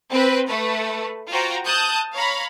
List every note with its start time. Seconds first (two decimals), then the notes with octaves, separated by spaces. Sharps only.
0.10 C4 B4
0.48 A3 B4
1.30 F4 F#4 C5 G5 A#5
1.66 A5 D#6 F#6 G6
2.15 C#5 F5 A#5 B5